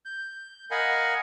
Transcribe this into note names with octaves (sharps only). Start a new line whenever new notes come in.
G6
A#4 D#5 F5 F#5 G#5 B5